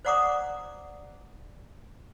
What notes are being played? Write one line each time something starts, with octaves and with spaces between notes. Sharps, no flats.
C5 D5 F#5 A#5 D6 D#6